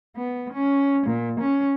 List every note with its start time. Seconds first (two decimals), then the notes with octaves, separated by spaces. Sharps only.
0.16 B3
0.53 C#4
1.07 A#2
1.40 C#4